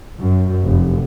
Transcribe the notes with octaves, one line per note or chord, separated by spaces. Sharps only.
F#2
F1